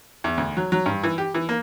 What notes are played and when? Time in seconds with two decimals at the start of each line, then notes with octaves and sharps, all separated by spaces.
0.24 E2
0.38 D2
0.57 F#3
0.72 F#3
0.86 G2
1.03 E3
1.18 G4
1.34 E3
1.49 A#3